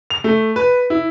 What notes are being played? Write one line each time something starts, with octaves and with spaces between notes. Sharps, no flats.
F7
A3
B4
E4